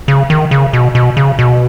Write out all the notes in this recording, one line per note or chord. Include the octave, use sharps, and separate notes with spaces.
C#3
D#3
C#3
B2
B2
C#3
B2